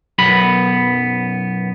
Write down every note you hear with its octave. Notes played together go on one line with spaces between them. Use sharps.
B1 F#2 B3 B5